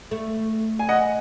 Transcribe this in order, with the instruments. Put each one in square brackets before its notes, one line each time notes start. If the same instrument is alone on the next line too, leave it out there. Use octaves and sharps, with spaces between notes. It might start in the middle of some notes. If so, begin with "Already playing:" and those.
[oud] A3
[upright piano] G#5
D#5 F#5